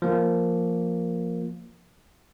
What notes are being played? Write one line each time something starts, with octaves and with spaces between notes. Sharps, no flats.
F3 A#3